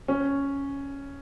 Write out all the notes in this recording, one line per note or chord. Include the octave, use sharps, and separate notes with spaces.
C#4